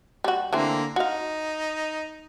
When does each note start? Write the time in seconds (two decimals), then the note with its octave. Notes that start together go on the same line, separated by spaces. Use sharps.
0.24 G3 F#4
0.53 D3 E3 A3 A#3 C4
0.96 D#4 F#4 F5